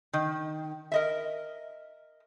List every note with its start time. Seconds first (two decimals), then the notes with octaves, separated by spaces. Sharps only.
0.13 D#3
0.92 A#4 D#5 E5